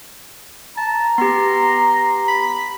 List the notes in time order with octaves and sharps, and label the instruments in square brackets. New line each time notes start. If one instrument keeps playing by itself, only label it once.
[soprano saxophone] A5 [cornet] A#5
[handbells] B3 G4 [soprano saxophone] C6
[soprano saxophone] B5